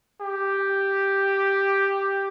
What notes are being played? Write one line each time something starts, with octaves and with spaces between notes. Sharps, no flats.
G4